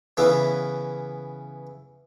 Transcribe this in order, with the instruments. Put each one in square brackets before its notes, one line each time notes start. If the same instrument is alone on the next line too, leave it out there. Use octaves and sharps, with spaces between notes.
[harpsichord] C#3 E3 B3 C#4 E4